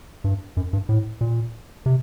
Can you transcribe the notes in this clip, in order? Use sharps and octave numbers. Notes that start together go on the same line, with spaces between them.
G2
F#2
G2
A2
A#2
C3